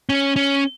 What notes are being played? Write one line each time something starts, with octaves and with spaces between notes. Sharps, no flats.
C#4
C#4